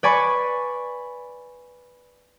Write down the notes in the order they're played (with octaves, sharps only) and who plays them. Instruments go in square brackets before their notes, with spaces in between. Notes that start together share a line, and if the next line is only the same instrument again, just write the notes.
[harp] B4 D5 G#5 B5 C#6